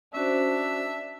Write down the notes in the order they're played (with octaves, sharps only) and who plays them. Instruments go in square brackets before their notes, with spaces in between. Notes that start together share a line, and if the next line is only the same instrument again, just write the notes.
[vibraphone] C#4 F#4 C5 [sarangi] D4 [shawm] E5